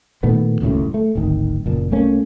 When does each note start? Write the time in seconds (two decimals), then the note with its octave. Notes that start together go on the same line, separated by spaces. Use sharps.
0.23 A#2 D#3 A3 B3
0.61 D#1 C#2 F#2 A2
0.94 A3
1.15 D1 G#1 D#3
1.66 F#1 A#2
1.92 C2 A3 A#3 C#4